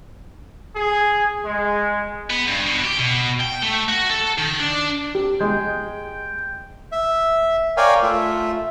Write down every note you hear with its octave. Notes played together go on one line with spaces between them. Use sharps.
G#4
G#3
B3
G2
B2
G4
B2
G5
A3
F#4
A4
D#3
D4
G4
G#3 G5
E5
A#4 C#5 D5 F5 G5 G#5
A3 F4 E5